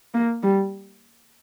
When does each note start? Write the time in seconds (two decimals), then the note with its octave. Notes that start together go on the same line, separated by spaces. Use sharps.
0.14 A#3
0.43 G3